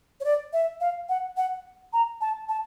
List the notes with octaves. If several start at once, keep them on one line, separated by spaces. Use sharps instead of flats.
C#5
D5
E5
F5
F#5
F#5
A#5
A5
A5